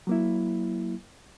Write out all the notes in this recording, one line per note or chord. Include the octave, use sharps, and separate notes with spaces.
F#3 A#3 E4